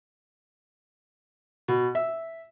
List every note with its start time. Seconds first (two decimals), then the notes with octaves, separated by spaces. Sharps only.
1.68 B2
1.95 E5